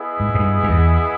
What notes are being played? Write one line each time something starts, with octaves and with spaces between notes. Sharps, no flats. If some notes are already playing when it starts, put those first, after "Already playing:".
Already playing: B3 E4 G#4 D#5
G#2
G#2
G2
G2
E2